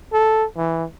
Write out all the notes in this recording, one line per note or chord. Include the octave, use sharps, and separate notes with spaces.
A4
E3